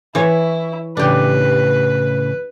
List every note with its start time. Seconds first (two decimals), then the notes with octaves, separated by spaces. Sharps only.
0.15 E3 E4 C#5
0.97 A2 C#3 E3 D4 G4 B4